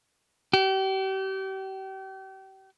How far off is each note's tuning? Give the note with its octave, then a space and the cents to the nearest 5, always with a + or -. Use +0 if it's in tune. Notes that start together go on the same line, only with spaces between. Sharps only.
G4 -35